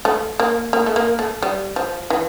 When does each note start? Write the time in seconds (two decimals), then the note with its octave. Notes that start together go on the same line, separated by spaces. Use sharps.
0.05 A3
0.40 A#3
0.73 A#3
0.86 A3
0.96 A#3
1.19 A3
1.43 G3
1.76 F3
2.10 E3